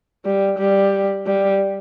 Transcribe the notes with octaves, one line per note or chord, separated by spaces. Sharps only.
G3
G3
G3